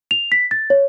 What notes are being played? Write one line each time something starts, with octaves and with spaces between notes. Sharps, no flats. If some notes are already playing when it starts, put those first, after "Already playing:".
F7
B6
A6
C#5